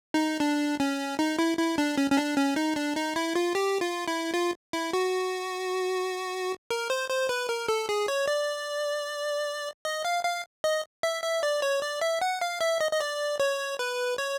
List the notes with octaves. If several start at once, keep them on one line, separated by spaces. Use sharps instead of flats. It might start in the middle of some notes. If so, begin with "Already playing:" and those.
D#4
D4
C#4
D#4
E4
E4
D4
C#4
C#4
D4
C#4
D#4
D4
D#4
E4
F4
G4
F4
E4
F4
E4
F#4
A#4
C5
C5
B4
A#4
A4
G#4
C#5
D5
D#5
F5
F5
D#5
E5
E5
D5
C#5
D5
E5
F#5
F5
E5
D#5
D#5
D5
C#5
B4
C#5